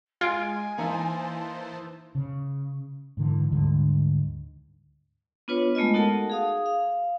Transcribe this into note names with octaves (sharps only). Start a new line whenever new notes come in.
G#3 F4 G#5 G#6 D7
E3 A#3 D#4 E4 C5 A5
C#3
G#2 D3 E3
D2 G#2 D3 G3
B3 D4 F4 B4 C#5
G#3 A3 B3 F4 D#5
D#4 F#4 A4 A#4 F#5 A5
G#4 F5 D#6
F5